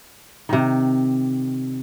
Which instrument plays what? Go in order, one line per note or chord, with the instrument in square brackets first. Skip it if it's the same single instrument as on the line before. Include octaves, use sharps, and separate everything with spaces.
[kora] C3 D#3